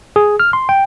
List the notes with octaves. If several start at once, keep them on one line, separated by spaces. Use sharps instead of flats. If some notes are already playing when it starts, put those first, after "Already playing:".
G#4
F6
C6
G5